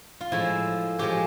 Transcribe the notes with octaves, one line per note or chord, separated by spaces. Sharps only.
F4
A2 F3 G#3 E4
A2 F3 G#3 G4